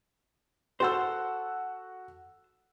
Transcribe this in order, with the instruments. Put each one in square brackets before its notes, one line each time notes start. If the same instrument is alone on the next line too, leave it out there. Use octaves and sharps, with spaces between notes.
[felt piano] F#4 F#5 E6 [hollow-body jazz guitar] A4 C5